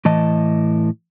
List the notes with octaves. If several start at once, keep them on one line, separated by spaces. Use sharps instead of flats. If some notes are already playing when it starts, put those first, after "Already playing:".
A2 E3 D#5 A5